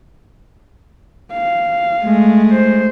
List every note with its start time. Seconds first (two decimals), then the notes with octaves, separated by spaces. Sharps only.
1.32 F5
2.05 G#3 A3
2.52 C5